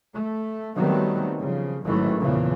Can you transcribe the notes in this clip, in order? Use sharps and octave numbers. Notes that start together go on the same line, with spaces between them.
A3
D#3 F#3 G3 A3 B3 C4
C#3 F3
A1 G#2 D#3 E3 F#3 A3
E2 A#2 C#3 E3 F3